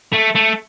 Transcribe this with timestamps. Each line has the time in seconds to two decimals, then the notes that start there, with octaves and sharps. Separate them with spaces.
0.13 A3
0.35 A3